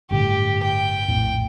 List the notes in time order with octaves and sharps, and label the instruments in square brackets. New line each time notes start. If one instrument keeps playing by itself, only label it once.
[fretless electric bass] G1 A2 D3 [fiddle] G4
[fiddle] G5
[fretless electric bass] A#1 F2 A2